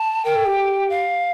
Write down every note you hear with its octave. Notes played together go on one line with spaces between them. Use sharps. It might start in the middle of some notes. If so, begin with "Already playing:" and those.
Already playing: A5
A#4 G5
A4
G4
F5